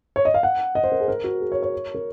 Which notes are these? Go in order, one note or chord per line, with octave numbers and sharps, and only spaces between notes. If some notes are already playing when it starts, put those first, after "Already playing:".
C#5
D#5
F5
F#5
D#5
C5
A#4
G#4
A#4
F#4
G#4
C#5
C#5
A#4